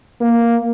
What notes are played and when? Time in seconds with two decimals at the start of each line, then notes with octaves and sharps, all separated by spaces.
0.20 A#3